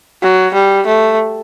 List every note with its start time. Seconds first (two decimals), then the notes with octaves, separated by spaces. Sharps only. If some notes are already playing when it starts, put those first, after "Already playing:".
0.22 F#3
0.54 G3
0.87 A3